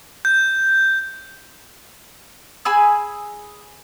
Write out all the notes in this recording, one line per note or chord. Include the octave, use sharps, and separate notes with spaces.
G6
G#4 G#5 B5 E6